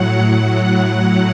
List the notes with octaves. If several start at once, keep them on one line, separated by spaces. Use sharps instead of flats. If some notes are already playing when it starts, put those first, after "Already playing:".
Already playing: A2 F#3 F#5
F#5